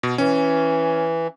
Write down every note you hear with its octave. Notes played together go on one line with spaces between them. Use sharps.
B2
E3 C#4